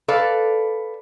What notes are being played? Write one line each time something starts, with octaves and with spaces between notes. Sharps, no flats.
A4 B4 D5 F5